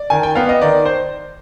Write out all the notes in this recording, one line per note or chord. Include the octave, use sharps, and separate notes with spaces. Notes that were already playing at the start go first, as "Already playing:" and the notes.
Already playing: D5
D#3 G#5
G5
B3 F5
D#5
D#3 D5
C5